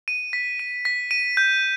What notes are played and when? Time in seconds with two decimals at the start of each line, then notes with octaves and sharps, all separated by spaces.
0.08 D#7
0.33 B6
0.59 D#7
0.85 B6
1.11 D#7
1.37 G6